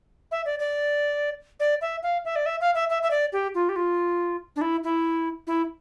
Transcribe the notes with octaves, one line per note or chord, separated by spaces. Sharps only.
E5
D5
D5
D5
E5
F5
E5
D5
E5
F5
E5
E5
E5
D5
G4
F4
G4
F4
D4
E4
E4
E4